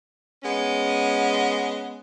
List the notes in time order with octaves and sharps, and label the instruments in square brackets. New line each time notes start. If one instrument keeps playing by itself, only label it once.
[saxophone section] G#3 B3 C#4